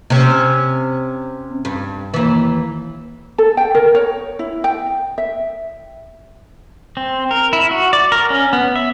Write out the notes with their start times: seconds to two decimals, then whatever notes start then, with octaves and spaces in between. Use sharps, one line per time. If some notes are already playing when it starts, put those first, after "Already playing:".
0.10 C3 C#4
1.65 G2
2.14 D#2 E3
3.38 A4
3.57 G5
3.75 A#4
3.95 C#5
4.39 E4
4.64 G5
5.18 E5
6.97 C4
7.31 A#4
7.53 E4
7.71 F#4
7.93 D5
8.12 A#4
8.30 C#4
8.53 B3
8.76 E5